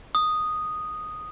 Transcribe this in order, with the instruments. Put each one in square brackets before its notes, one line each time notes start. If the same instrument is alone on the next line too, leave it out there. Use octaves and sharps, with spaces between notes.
[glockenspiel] D#6